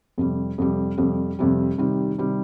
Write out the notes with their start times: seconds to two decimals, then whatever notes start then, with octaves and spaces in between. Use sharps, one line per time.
0.18 F2 C3 G3
0.58 F2 C3 G3
0.97 F2 C3 G3
1.39 F2 C3 G3
1.78 C3 D#3 G3
2.18 C3 D#3 G3